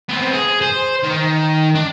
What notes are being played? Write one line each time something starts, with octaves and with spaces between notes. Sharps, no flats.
B3 C4
G#4
C5
D#3
D4